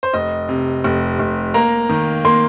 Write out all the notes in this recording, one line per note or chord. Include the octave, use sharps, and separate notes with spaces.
C5
F1 D#5
C3
F1
F1
A#3 A#5
D#3
A#3 C6